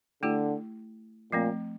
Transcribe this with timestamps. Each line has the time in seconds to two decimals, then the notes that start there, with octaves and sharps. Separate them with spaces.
0.22 D3 A3 E4 G4
1.32 A#2 F3 A3 C4